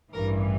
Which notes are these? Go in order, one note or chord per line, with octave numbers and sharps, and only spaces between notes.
A1 G2 E3 A#4